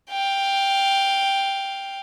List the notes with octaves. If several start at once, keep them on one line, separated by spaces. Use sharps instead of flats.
F5 G5